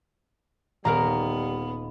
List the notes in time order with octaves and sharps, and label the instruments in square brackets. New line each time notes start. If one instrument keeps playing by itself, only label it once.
[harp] D#1 [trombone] G3 [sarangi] B3 [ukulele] A#4 F5 A#5